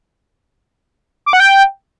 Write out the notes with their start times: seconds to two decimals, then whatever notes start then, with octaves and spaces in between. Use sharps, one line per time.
1.26 D6
1.33 F#5
1.40 G5